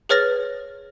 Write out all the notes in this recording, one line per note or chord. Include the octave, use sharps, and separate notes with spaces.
G#4 B4 C#5 F6 A6 A#6